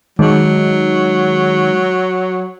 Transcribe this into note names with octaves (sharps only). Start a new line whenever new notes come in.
D#3 F#3 G#3 D#4